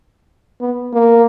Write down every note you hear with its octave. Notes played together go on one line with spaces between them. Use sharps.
B3
A#3